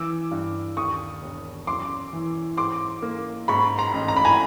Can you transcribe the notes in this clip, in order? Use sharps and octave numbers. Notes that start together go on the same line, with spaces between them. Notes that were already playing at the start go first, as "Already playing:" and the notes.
Already playing: E3 D6 E6
G2
D#2 C#6 D#6
E1
F#2 C6 D6
E3
G#2 C6 D6
A#3
G#2 B5 C#6
A#5 C6
A1
A#5
B5
G#5 A#5